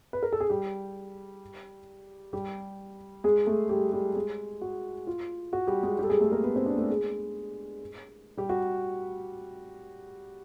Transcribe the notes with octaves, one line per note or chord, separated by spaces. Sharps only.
B4
A#4
A4
G#4
G3 G4
G3 G4
G#3 G#4
A3 A4
G3 G4
G3 G4
G#3 G#4
F#4
F4
F#4
G3 G4
G#3 G#4
G3 G4
A4
G#3 G#4
A3 A4
A#3 A#4
B3 B4
C4 C5
D4 D5
A3 A4
G#3 G#4
G3 G4
F#4